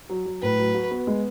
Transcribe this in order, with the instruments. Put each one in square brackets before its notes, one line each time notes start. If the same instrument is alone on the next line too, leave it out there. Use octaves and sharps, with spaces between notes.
[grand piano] F#3
F#3
[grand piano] A2 [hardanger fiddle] B4
[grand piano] F#3
F#4
B3
G#3